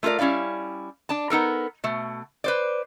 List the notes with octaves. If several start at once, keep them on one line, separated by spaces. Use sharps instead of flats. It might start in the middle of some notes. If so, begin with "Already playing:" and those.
A3 F4 G#4 A#4 D5
G3 C#4 E4 D5 F5
D4 A5
B3 D#4 A4 A#4
B2 A3
B4 C5 D5